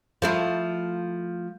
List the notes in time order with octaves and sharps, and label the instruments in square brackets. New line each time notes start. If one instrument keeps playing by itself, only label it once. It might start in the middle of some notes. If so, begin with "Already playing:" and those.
[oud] F3 A3 E4